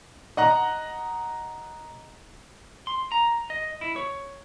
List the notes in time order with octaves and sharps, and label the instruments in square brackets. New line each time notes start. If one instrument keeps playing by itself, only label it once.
[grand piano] D#5 F#5 A#5
[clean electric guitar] C6
A#5
D#5
E4
C#5